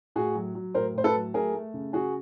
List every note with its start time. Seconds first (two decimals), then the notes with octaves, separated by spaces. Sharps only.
0.16 A2 F#4 G#4
0.35 F#3
0.55 F#3
0.74 A2 A#4 C5
0.95 A2 C5
1.04 A4 B4
1.14 F#3
1.34 A3 G#4 A#4
1.54 A3
1.74 C#3
1.93 C#3 F#4 G#4